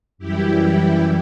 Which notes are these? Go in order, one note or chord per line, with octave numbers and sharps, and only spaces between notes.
F#2 E3 G3 E4 G4